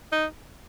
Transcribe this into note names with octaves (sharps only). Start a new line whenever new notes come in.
D#4